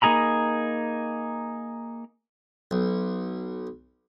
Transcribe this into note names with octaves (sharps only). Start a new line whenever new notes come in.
A#3 D#4 G#4 A#5 B5
B1